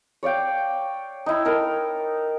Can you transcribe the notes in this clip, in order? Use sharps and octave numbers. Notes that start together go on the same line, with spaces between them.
C#5 D5 F5 G5
D#4 E4
D#4 A4 A#4